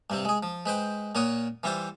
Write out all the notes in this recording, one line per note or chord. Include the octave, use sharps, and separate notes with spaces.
G2 C3 C4
G#3 G#4
F3
G#3 B4 C5 G5
A#2 A#3 C#5 F#5 D#6
E3 G3 E4 F4 C5